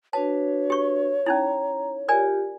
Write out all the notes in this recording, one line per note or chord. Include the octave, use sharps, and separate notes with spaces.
D4 F#4 B4 C#5 A5
G4 C#6
C#4 D#4 E4 A#5
F4 G4 A#4 D5 G#5